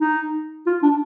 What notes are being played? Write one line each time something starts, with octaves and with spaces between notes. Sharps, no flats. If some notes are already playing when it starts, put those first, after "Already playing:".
D#4
F4
D4